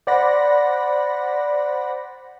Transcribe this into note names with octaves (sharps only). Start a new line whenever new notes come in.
C5 D5 F#5 B5 A#6